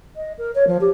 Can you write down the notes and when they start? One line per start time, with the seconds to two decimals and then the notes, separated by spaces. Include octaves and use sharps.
0.16 D#5
0.38 A#4
0.55 C#5
0.67 F3
0.80 G4